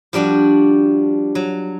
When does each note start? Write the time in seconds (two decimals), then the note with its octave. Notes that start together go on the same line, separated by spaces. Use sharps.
0.13 F3 G3 D4 F#4
1.35 F#3